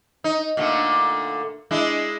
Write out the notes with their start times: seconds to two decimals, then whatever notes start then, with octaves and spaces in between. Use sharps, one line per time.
0.24 D#4
0.57 A#2 D3 A3
1.71 G#3 D4 E4